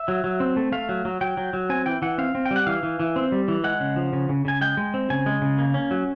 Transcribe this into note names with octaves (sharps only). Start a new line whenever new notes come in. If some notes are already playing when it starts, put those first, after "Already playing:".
Already playing: E5
F#3
F#3
C4
A3
A3 F5
F#3
F#3
F#3 G5
F#3
F#3
C4 G#5
E3 G5
E3 F#5
C4 F5
C4
G5
G3
F#5
E3 F5
E3
E3
C4
G3
E3
G#3 F#5
C#3
F3
C#3
C#3
C#3 G#5
G#3 G5
G#3
C4
C#3 G#5
G#3
C#3
A#3
C#4
F#3